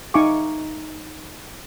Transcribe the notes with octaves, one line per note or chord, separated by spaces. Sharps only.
D#4 E5 F5 G#5 C#6 D6